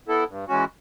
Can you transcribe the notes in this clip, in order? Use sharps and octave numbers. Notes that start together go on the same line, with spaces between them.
B3 E4 A4
G2
E3 G#3 C#4 F#4